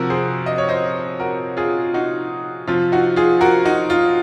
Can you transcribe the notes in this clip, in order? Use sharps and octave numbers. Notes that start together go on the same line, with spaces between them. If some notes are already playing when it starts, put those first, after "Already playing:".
Already playing: C3 F3 F#4 A#4
G#4 C5
D#5
C#5
C5 D#5
F#4 A#4
F4 G#4
D#4 F#4
C3 F3 F4
D#4 F#4
F4 G#4
F#4 A#4
D#4 F#4
F4